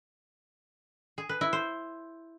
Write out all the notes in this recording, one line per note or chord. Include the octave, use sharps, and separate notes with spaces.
G#4
B4
E4
C5